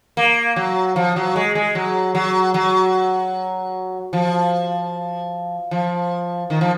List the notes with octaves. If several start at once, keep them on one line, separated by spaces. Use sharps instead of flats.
A#3
F#3
F3
F#3
G#3
G#3
F#3
F#3
F#3
F3
F3
D#3
F3